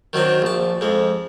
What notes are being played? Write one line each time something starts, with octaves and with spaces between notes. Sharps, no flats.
D#3 F#3 C4 D4
A#1 A5
F2 G#3